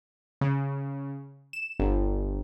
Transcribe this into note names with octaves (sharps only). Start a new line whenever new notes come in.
C#3
E7
G1